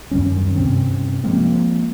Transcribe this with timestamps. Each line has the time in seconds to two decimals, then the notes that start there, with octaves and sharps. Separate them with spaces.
0.11 F#2 D#3 G3 C#4
0.56 G2 C3 C4 C#4
1.24 F3 G#3 A#3 C4